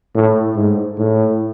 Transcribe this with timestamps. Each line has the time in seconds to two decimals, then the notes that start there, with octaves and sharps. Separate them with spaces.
0.16 A2
0.56 G#2
0.99 A2